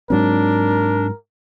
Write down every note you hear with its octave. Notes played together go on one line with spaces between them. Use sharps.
G#2 F#3 C4 D4 A#4